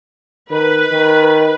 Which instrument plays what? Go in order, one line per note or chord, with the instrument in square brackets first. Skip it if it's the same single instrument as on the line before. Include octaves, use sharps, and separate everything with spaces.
[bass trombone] D#3 [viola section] B4
[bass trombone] D#3